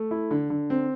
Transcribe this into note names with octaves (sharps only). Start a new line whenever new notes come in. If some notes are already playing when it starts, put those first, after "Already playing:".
Already playing: A3
E4
D3
D3
C4